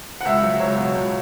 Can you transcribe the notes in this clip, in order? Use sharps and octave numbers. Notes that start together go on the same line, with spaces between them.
F#5
C#2 E5
F#3
C#2 C#5
B2
C#2